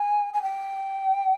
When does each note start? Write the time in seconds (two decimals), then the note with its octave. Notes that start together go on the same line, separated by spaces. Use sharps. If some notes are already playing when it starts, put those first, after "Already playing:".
Already playing: G#5
0.33 G#5
0.42 G5